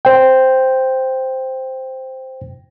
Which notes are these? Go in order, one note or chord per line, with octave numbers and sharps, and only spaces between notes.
C5 G5